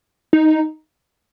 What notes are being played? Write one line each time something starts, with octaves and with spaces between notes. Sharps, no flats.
D#4